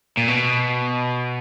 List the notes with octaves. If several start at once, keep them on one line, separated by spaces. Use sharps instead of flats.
A#2
B2